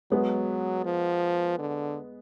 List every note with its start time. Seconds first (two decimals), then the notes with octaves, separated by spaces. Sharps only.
0.11 F#3 G#3 B3
0.85 F3
1.59 D3